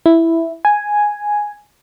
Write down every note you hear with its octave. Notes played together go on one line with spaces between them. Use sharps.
E4
G#5